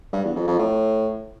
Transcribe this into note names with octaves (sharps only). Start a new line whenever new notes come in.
G2
E2
F2
F2
A2